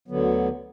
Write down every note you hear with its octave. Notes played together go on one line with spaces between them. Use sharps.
D2 D3 F#3 B3